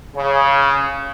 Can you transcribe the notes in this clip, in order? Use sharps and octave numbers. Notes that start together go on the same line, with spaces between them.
C#3